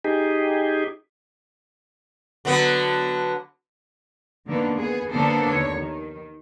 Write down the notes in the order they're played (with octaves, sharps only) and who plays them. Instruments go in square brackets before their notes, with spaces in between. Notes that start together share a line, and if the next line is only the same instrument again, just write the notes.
[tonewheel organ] D#4 G4 G#4
[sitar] D3 F#3 B3
[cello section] D3 D#3 A#3 B3 D4
B3 G#4
D3 A#3 B3 D4 A4 C5
D#2 D3 C#5
D#3